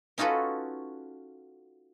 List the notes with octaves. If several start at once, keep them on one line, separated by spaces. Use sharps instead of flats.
C#4 D#4 F4 F#4 A4 B4